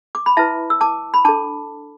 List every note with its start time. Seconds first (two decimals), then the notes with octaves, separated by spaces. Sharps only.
0.15 D6
0.26 B5
0.37 E4 B4 E5 A5
0.70 E6
0.81 A5 D6
1.14 B5
1.25 D4 A4 A5 D6